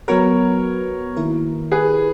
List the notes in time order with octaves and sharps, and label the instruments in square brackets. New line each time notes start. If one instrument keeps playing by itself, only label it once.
[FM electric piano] F#3 B3 F#4 B4 [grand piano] A#4 C#5
[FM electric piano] D#3 A#3 E4 A#4
[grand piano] G#4 B4